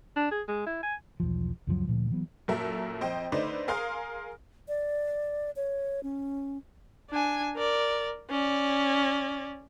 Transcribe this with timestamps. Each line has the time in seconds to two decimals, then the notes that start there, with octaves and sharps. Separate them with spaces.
0.16 D4
0.31 G#4
0.48 G#3
0.66 E4
0.83 G#5
1.20 B1 E2 F3
1.67 C#2 F#2 F3 F#3
1.87 D2 A#2 F3
2.10 E3 F#3 B3
2.48 F#2 A#2 A4 A#4 E5
3.01 F2 C5 D#5 G5
3.32 D3 A3 D#4 B4 C5 D5
3.68 G#4 A#4 F5 C6 D#6 F6
4.68 D5
5.56 C#5
6.03 C#4
7.10 D4 G#5
7.56 A#4 D5
8.30 C#4 D5